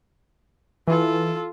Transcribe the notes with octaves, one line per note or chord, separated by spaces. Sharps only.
E3 F4 A4